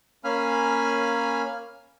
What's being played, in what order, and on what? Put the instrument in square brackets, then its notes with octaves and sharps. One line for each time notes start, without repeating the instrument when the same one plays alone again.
[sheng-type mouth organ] A#3 C#4 F5 G#5 B5 F6